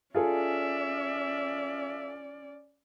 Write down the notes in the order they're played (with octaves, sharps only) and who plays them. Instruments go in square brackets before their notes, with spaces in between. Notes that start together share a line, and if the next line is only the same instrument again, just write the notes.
[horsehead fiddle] C#4 D5 [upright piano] F4 G#4 A4 [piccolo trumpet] E5